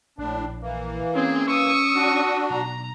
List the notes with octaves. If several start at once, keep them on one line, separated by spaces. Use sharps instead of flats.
A#1 A2 D4
E3 A#3
C4 C#4 G#4
C#6 D#6 E6
D4 F#4
B1 A#5